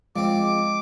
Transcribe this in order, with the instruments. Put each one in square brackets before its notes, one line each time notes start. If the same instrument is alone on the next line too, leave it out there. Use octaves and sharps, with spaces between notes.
[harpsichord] F3 C4 [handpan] G#3 [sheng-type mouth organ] D6